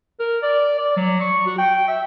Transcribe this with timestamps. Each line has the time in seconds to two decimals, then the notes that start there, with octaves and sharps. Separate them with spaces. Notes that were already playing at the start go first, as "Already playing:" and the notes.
0.20 A#4
0.43 D5
0.78 D5
0.97 F#3
1.20 C#6
1.47 F#4
1.58 G5
1.88 E5